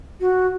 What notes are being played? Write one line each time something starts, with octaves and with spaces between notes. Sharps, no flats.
F#4